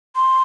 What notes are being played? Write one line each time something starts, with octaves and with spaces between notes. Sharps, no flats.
C6